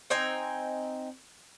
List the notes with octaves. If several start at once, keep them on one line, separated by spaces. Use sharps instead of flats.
C4 D#4 G5 G#5